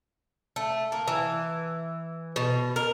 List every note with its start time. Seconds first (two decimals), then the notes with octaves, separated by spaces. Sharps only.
0.56 A3
0.92 A#3
1.08 E3
2.36 B2
2.76 A#4